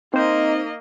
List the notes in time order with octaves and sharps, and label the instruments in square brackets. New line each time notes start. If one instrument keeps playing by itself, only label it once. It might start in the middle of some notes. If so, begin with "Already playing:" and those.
[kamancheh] A#3 D#5 [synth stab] C4 C5 [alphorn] D#4